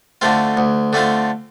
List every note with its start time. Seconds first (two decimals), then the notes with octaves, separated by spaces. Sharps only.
0.21 D3 A3 C4 F4
0.57 D2
0.93 D3 A3 C4 F4